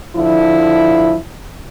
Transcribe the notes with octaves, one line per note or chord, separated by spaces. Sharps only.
D3 F3 E4